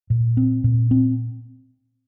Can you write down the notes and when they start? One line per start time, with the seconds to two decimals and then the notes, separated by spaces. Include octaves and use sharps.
0.10 A#2
0.37 C4
0.64 A#2
0.91 C4